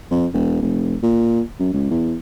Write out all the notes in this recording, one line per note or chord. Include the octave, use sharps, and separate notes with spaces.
F2
E1
F1
A#2
F#2
C#2
E2